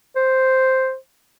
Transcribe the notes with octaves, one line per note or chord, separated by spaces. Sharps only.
C5